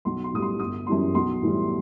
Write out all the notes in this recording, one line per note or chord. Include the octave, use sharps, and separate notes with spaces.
B1 C6
C6
A2 G3 D#6
C6
G1 D#6
F#2 E3 G3 C6
B1 C6
A2 E3 G3